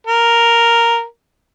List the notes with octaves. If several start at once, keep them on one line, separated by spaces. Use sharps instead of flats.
A#4